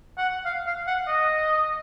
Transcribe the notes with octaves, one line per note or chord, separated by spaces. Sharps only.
F#5
F5
F5
F#5
D#5